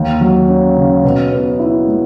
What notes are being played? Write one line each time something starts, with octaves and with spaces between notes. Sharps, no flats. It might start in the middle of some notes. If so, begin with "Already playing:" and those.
Already playing: D#2
F#3
C#4
C#3
B2
B3
E4
G#3